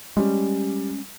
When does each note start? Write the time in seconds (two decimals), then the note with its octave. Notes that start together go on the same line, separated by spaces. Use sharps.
0.17 G3 G#3 C#4